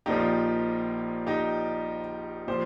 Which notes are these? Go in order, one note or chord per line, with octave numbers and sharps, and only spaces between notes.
A#1 A#2 F3 D#4 G4
D#4 G4
A#2 F3 G4 C5